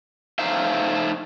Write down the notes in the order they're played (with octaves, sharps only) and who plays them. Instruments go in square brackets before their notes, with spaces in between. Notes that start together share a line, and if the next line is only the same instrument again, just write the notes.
[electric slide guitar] A3 D#4 C5 E5 F5